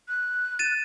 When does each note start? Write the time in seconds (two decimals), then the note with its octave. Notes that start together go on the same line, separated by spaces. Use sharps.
0.08 F#6
0.59 A6 D#7 E7